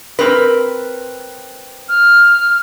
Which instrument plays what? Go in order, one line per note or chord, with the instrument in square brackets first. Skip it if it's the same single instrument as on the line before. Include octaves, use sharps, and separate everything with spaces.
[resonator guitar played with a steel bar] C4 A#4 B4
[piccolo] F6